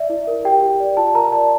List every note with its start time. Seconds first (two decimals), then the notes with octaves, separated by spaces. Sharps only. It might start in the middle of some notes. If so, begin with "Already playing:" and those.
Already playing: D5 E5
0.10 E4
0.27 A#4
0.45 G4 G5
0.62 G4
0.80 D5
0.97 F4 A5
1.15 A#4 A#5
1.32 D5 A5